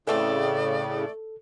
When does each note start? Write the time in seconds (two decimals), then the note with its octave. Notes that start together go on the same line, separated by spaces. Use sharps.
0.07 A2 C#3 E3 A3 C4 A4 D5